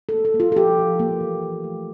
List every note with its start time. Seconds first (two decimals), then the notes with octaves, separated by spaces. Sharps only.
0.09 A4
0.14 A#3
0.25 A4
0.34 A#3
0.40 F4
0.52 A4
0.57 F3 G4
0.79 F3
1.00 A#3
1.20 E3
1.42 E3
1.64 A3